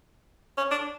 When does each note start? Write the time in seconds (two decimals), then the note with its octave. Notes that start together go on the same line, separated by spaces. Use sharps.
0.57 C#4
0.71 D4